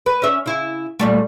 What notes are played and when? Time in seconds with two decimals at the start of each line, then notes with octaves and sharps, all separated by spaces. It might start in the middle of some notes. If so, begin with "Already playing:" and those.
0.06 B4
0.22 C#4 E5
0.46 C#3 E4
0.99 A#2 G3 A3